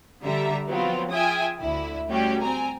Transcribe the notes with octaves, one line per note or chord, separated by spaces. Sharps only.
D3 G3 E5 A#5
F3 F#3 B3 C4 F4
F4 G#4 E5 G5 G#5 D#6
D2 D3 E4
G3 A3 C#4 F#4 G4 G5
C4 G#5 A#5